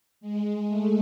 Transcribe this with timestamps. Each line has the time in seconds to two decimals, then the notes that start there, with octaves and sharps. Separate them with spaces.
0.21 G#3
0.68 A3